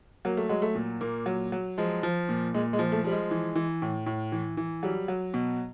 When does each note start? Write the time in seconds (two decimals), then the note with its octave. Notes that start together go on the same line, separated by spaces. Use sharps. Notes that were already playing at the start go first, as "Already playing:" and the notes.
0.25 F#3 A#3
0.37 A3
0.49 F#3 G#3
0.62 A3
0.75 A#2
1.01 A#2 A#3
1.26 F#3
1.52 F#3
1.78 F3 G#3
2.03 F3
2.29 A#2
2.54 A#2 G#3
2.73 G#3
2.79 F3
2.92 A3
3.04 F3 G3
3.12 G#3
3.31 E3
3.55 E3
3.82 A2
4.06 A2
4.32 E3
4.57 E3
4.83 F#3 G3
5.08 F#3
5.34 B2